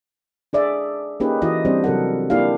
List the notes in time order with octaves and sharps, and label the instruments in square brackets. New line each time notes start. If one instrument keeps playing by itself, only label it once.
[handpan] D4 G#4 D5 E5
A#3 C#4 D#4 G4 G#4 B4
E3 E4 F#4 D#5
G3 C4 D4 C5
C3 F#3 A4 A#4 F#5
A#3 D4 E4 F4 G4 F5